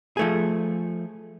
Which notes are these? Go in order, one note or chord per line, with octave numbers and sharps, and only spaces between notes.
F3 A3 G#4